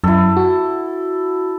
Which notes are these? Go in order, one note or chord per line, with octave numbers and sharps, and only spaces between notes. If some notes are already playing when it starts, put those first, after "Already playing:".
F#2 E4 A4
F#4